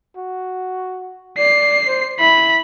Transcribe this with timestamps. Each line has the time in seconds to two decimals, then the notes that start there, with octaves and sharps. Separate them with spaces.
0.17 F#4
1.38 D5 C7
1.87 C5
2.19 E4 B5